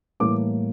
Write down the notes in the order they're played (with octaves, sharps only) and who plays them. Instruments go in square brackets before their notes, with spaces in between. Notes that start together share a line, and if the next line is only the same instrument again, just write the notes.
[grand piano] A2 E3 G3 A#3 D6